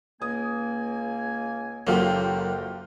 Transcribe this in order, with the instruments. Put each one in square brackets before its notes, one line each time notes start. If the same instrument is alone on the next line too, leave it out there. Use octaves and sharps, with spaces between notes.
[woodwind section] C#2 A#3 G#5 [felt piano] D#6
[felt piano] F#1 A4 [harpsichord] F#3 [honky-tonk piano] A#3 F4 G4